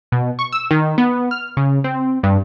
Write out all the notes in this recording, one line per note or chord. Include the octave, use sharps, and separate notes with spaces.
B2
C#6
E6
D#3
B3
F6
C#3
C4
G2